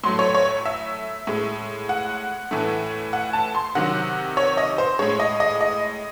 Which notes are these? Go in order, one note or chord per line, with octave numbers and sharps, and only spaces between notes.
A2 F#3 A3 C6
C#5
C#5
E5
A2 G#3
F#5
A2 E3 A3
F#5
A5
C6
C3 D#3 F#3 F#5
C#5
D#5
C5
A2 G#3 C#5
D#5
D#5
D#5